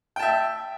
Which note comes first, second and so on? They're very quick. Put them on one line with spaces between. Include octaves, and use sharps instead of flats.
G5 A5 E5